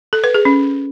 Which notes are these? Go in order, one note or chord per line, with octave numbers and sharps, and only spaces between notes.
A4
B4
G#4
C#4